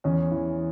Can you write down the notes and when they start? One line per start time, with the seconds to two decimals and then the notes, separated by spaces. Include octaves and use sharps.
0.04 E2 C#4
0.31 E3